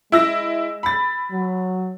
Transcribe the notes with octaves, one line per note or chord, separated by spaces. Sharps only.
G#3 E4 E6 A#6
B5 A6
F#3